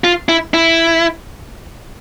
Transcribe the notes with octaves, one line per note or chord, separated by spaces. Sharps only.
F4
E4
E4